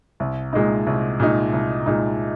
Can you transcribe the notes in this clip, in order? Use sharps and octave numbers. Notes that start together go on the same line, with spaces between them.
C2
A#2 G#3 D#4
C2
A#2 G#3 D#4
C2
A#2 G#3 D#4